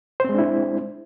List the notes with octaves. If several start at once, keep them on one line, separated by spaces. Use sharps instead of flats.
G#3 C4 D4 E4 C5